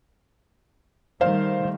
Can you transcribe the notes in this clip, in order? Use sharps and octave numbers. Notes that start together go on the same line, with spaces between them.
D#3 G3 A3 C5 F5